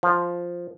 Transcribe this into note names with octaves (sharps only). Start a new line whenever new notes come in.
F3